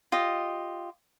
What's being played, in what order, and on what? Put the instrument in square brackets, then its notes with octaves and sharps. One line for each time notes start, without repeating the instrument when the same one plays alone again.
[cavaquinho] F4 G4 D#5